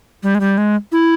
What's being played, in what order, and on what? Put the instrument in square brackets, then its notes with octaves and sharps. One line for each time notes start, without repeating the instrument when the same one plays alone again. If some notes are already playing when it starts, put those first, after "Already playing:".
[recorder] G3
G#3
G3
G#3
E4